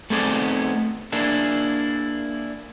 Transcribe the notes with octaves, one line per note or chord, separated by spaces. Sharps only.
A3 B3 C4 D#4 G#4 D5
A#3 D4 E4 G#4